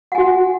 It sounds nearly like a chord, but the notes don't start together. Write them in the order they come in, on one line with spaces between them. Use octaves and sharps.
F#5 G#5 F#4